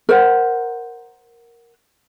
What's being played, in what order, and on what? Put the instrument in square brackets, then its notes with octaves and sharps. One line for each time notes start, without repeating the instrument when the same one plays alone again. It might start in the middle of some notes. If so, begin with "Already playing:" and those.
[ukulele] A#4 C5 F#5